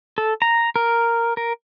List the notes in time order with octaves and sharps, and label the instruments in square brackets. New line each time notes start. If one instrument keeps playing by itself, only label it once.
[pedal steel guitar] A4
A#5
A#4
A#4